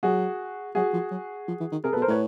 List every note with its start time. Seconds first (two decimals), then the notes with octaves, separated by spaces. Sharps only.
0.03 F#3 F#4 G#4
0.75 F#3 F#4 G#4
0.93 F3
1.11 F#3
1.48 F3
1.60 E3
1.72 D#3
1.84 C3 G#4 A#4
1.93 B2 A4 B4
2.02 A#4 C5
2.08 A2 B4 C#5